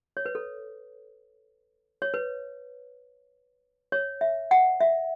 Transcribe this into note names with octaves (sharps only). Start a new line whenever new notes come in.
C#5
B4
A4
C#5
B4
C#5
E5
F#5
E5